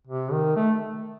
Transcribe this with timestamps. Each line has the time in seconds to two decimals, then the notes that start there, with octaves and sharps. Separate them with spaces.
0.07 C3
0.32 D#3
0.56 A3